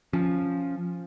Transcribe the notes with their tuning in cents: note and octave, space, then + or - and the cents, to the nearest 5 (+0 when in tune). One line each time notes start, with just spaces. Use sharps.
F3 +0 C#4 +0